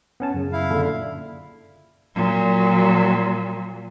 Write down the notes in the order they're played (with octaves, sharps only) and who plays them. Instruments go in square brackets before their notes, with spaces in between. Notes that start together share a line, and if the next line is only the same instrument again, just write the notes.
[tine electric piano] B3 C#4 A5
F#2 C#3
[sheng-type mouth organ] E4 F5
[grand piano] A#2 D3
[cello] A#2 F#3